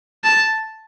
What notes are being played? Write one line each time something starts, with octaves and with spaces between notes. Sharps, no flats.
A5